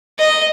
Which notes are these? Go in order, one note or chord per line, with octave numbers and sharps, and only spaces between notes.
D#5